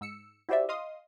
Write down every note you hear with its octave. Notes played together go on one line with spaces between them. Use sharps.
G#2 E6 C#7
E4 F#4 G4 C5 D5 E5
D#5 F5 C6 D#6